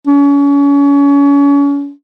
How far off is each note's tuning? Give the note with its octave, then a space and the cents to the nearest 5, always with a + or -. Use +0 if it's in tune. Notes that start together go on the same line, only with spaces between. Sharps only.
C#4 +35